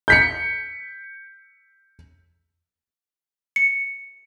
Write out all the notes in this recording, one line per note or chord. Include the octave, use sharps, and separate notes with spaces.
G6 B6 C#7
C#7